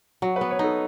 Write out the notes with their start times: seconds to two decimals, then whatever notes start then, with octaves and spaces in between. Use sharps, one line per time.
0.22 F#3 F#4
0.36 B4
0.41 B3
0.51 C#5
0.59 D#4 A4